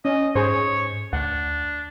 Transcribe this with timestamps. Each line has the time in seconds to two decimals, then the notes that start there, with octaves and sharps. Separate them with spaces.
0.05 C#4 D#5
0.35 G#2 G#4 C5 C#5
1.13 D2 D4 F#5